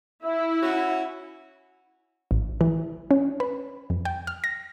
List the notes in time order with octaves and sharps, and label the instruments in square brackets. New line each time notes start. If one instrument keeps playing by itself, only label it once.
[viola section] E4 [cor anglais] E5
[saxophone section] C#4 F#4
[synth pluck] A1
E3
C#4
B4
F2
G5
F6
A#6